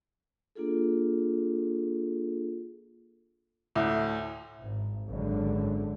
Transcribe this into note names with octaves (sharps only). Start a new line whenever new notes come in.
A#3 D4 F4 G#4 A4
D2 A2
G#1
G#1 F#2 D3